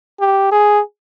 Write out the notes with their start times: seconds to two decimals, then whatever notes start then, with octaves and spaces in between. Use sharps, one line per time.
0.20 G4
0.52 G#4